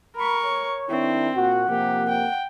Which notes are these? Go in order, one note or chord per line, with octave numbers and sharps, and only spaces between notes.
A#4 B5 C#6
C#5
D#3 C4 D4 E4
A#2 F#4 F#5
C3 F3 A#3 G4
G5